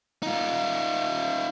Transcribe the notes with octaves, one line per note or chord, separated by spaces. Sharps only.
D#4 F4